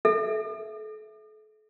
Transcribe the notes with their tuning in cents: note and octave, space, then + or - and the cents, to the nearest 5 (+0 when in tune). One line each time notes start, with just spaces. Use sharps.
A4 -40 E5 +0